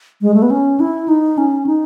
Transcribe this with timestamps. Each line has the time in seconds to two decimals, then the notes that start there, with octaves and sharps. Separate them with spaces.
0.22 G#3
0.34 A3
0.42 B3
0.50 C#4
0.80 E4
1.08 D#4
1.38 C#4
1.66 D#4